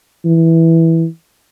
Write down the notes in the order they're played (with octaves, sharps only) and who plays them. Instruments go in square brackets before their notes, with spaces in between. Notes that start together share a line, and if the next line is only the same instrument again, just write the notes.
[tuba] E3